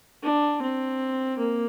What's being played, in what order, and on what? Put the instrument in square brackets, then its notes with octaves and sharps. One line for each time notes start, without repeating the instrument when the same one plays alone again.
[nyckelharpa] D4
C4
A#3